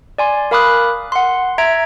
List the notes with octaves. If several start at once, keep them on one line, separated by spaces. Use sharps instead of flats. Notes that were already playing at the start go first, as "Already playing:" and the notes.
D5 G#5 C6
A#4 F5 B5 D6 D#6 F#6
F#5 C6
E5 A#5 G#6 D7